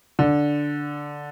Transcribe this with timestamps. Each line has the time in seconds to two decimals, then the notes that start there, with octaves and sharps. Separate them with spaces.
0.19 D3